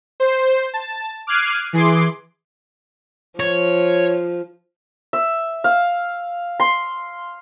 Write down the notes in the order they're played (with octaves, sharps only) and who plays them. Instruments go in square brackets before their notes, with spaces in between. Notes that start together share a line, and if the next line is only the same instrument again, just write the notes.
[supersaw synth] C5
A5
D6 F6 F#6 G#6 C7 D#7
E3 G#4 C6 D6
[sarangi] F3 [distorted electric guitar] C#5
[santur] E5
F5
C6